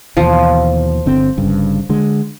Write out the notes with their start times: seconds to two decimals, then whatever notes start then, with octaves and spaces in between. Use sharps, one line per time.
0.17 D#2 B2 E3 F3
1.06 G1 D3 C4
1.37 G1 G2 C#3
1.89 D3 G#3